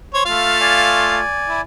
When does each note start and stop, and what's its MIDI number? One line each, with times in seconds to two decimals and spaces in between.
0.14 0.23 72
0.14 0.23 73
0.26 1.20 57
0.26 1.20 65
0.26 1.20 77
0.61 1.61 74
0.61 1.61 80
1.49 1.61 64